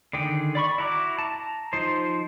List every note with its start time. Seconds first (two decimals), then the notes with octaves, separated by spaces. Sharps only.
0.13 D3 D#3 G#4 G5
0.55 D5 B5 C#6
0.78 E4 F#4 A#5 D6
1.19 A5 A#5
1.73 F3 D#4 C5